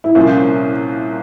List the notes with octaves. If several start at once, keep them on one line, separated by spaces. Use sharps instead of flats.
E4
C2 A#2 F3 A#3 C#4